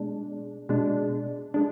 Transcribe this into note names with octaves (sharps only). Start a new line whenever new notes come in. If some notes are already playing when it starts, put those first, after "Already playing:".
Already playing: B2 G#3 D4
B2 G#3 D4
G#3 D4